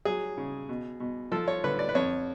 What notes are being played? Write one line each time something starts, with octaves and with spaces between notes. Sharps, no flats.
F#3 G#4
C#3
B2
B2
F3 A4
C#5
D3 B4
D5
B4
F2 C#5